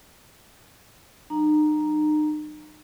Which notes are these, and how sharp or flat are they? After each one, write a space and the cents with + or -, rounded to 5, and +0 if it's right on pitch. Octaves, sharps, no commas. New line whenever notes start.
F#3 +0 D#4 -40 A#5 +0